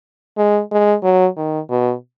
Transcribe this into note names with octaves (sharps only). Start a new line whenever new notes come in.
G#3
G#3
F#3
D#3
B2